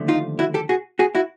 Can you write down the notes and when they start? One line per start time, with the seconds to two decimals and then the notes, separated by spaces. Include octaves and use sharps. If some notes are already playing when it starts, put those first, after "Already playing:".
Already playing: D#2 D3 F3 A3
0.08 D#4 F4
0.39 E4 F#4
0.54 G4 A4
0.69 F#4 G#4
0.99 F#4 G#4
1.15 E4 F#4